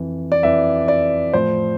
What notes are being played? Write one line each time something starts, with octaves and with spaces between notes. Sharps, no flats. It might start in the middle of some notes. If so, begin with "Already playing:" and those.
Already playing: F2 E3
D5
F2 E3 E5
D5
A2 F3 C5